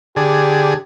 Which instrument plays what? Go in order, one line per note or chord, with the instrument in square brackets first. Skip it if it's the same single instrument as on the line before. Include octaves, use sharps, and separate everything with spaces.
[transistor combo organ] D3 G#4 [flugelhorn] G4